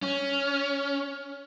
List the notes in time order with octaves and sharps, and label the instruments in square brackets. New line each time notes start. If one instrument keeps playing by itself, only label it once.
[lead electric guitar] C#4